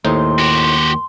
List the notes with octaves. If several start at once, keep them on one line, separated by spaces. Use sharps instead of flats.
D#2 A2 D#4 C5 C6
F#4 G4